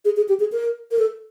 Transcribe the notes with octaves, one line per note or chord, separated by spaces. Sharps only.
G#4
G#4
G4
G#4
A#4
A#4
A4